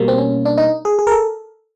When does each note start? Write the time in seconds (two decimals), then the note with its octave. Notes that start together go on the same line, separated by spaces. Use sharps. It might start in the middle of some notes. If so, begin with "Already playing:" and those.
Already playing: B2 G3 A#3
0.08 C4
0.18 C#4
0.45 D4
0.58 D#4
0.85 G#4
0.99 G#4
1.07 A#4
1.12 A4